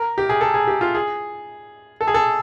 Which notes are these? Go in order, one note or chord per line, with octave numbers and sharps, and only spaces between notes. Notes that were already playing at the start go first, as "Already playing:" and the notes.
Already playing: A#4
G4
G#4
A4
G#4
G4
F4
G#4
A4
G#4
A4